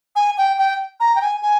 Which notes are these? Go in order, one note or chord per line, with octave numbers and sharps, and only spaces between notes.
G#5
G5
G5
A#5
G5
G#5
G#5